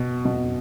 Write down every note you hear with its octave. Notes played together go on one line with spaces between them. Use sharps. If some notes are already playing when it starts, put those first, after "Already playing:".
Already playing: B2
B2